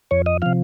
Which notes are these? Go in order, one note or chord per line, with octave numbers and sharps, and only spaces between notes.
F2 C#5
D#5
C3 F3 F5